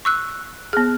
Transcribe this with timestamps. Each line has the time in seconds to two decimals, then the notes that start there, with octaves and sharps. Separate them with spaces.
0.05 C#6 E6 F#6
0.73 B3 G#4 F6